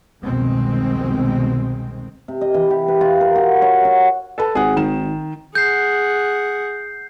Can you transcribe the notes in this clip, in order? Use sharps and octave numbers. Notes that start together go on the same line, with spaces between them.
C2 F2 B2 D#3 G#3 C4
C3
D#5
E3
G4
B4
F4
A#4
F#4
C#5
F#4
A4 B4 A5
G#1 G#4 F#5
D#3 E7
G#4 F#5 G6 C7